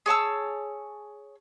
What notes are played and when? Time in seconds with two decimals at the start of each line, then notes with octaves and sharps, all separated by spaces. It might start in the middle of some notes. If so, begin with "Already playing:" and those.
0.06 G#4 C#5 A5 E6